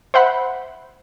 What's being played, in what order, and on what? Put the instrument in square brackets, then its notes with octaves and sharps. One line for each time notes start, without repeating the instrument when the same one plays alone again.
[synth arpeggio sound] C5 E5 F#5 B5